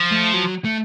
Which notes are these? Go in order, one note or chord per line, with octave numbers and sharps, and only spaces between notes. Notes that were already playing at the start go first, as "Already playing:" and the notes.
Already playing: F3
A3
F#3
A3